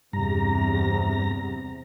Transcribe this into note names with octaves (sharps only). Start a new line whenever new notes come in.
E2 G2 C3 A#5